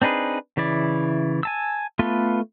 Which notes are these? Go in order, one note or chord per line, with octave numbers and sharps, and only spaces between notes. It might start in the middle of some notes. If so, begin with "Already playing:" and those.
C4 D4 D#4 G#4 B4
C#3 E3 E4 D5
G#5 A5 E6
A3 B3 F4 A4 B4